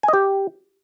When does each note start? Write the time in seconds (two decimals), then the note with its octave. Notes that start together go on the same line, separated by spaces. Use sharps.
0.03 G#5
0.08 D#5
0.13 G4